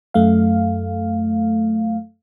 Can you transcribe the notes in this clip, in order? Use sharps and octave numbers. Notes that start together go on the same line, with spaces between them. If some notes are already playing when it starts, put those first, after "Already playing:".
F#2 A3 F5